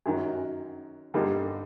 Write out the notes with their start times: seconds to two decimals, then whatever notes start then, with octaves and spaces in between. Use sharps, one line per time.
0.06 F#2 D#3 F#3
1.14 G2 D3 G3 A#3 D#4